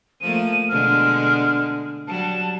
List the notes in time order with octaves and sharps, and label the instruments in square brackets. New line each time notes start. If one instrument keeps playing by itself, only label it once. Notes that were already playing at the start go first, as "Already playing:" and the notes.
[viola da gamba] F3 A3 A#3 [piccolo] D#7
[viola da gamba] B2 D3 G#3 [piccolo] F6
[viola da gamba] F#3 G3 [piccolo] A5